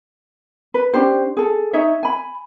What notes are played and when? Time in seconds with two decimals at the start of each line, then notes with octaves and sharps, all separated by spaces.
0.74 B4
0.94 C#4 D4 G4 C5
1.37 G#4 A4
1.73 D#4 C#5 D#5 E5
2.03 G#5 B5